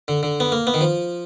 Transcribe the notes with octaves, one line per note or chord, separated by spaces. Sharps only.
D3
D3
B3
A#3
B3
D#3
F3